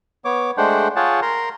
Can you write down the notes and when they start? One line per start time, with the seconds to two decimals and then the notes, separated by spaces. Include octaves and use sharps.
0.25 B3 C#5 D6
0.57 G#3 A3 D4 C5 F#5 G5
0.96 F4 G#4 C#5 F#5 G5 A5
1.22 A#4 A#5 C6